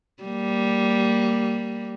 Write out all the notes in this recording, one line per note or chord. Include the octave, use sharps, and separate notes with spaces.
G3 A#3